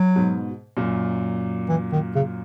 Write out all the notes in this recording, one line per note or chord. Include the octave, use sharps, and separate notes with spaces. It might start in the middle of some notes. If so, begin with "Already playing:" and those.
Already playing: F#3
G#2 B2
F#2 A#2
E3
D#3
C#3